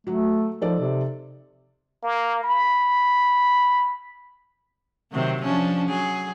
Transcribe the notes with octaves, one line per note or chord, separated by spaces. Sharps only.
F#3 A3 F#4
F3 D#4 A4 D5
C3
A#3
B5
C3 D#3 F#3
F3 C#4 D4
F#3 G#4